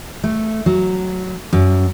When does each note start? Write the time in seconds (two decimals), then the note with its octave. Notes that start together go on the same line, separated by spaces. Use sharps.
0.24 A3
0.66 F#3
1.53 F#2